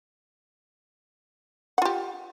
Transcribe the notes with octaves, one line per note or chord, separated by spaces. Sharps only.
F4 G4 F#5